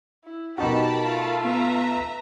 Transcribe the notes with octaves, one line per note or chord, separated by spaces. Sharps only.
E4
B2 D#4 F#4 G4 A#4 A5 B5
A3 F4
B3 B4 E5 A#5